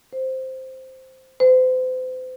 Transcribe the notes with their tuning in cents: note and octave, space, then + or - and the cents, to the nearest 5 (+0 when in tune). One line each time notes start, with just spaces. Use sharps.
C5 +0
C5 -40